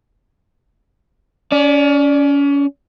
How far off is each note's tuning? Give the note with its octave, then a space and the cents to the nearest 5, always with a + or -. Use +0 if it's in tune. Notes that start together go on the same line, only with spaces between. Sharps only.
C#4 +30 D5 +0